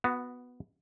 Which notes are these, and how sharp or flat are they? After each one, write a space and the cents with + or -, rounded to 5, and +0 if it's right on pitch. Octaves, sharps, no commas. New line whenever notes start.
B3 +0 F#4 -20